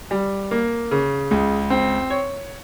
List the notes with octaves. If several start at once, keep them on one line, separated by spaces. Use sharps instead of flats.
G3
A#3
C#3
C#2
C4
C#5